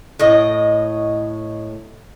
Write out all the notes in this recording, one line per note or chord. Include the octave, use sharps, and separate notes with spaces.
A2 D#5